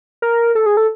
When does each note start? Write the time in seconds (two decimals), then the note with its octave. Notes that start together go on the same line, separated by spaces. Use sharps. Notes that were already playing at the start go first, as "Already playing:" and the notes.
0.22 A#4
0.55 A4
0.66 G#4
0.77 A4